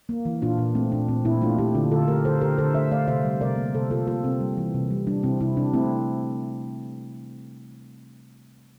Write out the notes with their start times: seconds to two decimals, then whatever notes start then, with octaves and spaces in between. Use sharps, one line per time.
0.09 A#3
0.25 E3
0.42 A#2 D4 F4
0.58 A#2 D4
0.75 A3 C4
0.92 A#2 D4
1.09 A#2 C4
1.25 A#2 C4 E4
1.41 A3 D4 F4
1.58 A3 E4 G4
1.75 D3 D4 F4
1.91 D3 F4 A4
2.08 A3 G4 A#4
2.25 D3 A4 C5
2.41 D3 G4 A#4
2.58 D3 A4 C5
2.75 A3 C5 E5
2.91 A3 D5 F5
3.08 C3 C5 E5
3.24 G3
3.41 C3 A#4 D5
3.57 A#3
3.74 C3 A4 C5
3.91 C3 F4 A4
4.07 A#3 F4 A4
4.24 C3 C4
4.41 G3
4.57 E3
4.74 C3
4.91 G3
5.07 G3 D4
5.23 C3 C4 E4
5.40 C3 C4 E4
5.57 C3 D4
5.73 A3 C4 E4